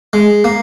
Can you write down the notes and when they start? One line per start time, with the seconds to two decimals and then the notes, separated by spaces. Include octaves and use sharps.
0.13 G#3
0.44 A#3